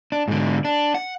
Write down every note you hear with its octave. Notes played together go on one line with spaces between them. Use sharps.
D4
G#2 D3
D4
F#5